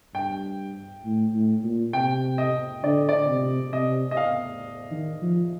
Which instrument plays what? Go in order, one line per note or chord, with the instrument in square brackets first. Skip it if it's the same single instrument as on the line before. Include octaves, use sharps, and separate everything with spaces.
[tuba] G2 [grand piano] G5
[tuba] A2
A2
A#2
[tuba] C3 [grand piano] G5
[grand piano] D#5
[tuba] D3 [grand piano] D5
[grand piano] D5
[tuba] C3
[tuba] C3 [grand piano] D#5
[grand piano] D#5
F5
[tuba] D#3
F3